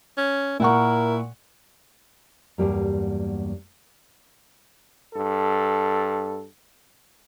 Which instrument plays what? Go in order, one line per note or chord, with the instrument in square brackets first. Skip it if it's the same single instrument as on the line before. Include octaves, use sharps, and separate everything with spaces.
[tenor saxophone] C#4
[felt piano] A#2 F#5 C#6 [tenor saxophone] E4 [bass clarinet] A#4
[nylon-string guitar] E2 G2 F#3 G3 A#3
[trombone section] G2 A4